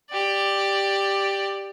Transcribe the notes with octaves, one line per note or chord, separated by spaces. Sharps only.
G4 D5